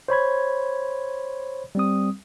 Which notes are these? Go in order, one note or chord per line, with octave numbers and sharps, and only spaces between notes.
C5 C#5 B5 G#6
G3 C4 D#6